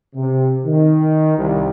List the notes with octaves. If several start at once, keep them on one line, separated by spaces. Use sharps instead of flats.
C3
D#3
C2